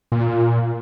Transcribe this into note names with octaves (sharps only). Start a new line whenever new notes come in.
A#2